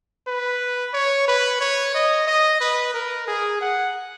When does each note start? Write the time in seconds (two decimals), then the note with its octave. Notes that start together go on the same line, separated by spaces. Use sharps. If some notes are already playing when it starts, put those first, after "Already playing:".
0.27 B4
0.94 C#5
1.28 B4
1.61 C#5
1.95 D#5
2.27 D#5
2.61 B4
2.94 A#4
3.28 G#4
3.61 F#5